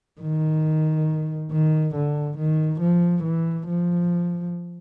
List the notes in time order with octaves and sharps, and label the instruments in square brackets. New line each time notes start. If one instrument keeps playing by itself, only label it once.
[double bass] D#3
D#3
D3
D#3
F3
E3
F3